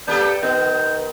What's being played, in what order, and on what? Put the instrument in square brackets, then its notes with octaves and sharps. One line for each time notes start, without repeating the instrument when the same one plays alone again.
[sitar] A#3 G4 A4 [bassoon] D4 [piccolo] G6
[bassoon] D#3 [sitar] B3 [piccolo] G6